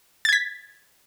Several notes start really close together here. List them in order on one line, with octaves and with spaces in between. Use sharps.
A6 G#6 B6